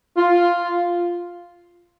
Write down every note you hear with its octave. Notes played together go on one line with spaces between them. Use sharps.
F4